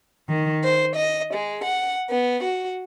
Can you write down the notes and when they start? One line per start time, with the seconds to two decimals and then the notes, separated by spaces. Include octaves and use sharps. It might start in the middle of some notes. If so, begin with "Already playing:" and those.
0.28 D#3
0.64 C5
0.96 D#5
1.34 G#3
1.64 F#5
2.10 B3
2.43 F#4